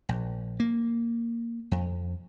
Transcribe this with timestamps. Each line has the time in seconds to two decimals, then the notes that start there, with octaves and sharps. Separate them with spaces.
0.09 A#1
0.60 A#3
1.71 F2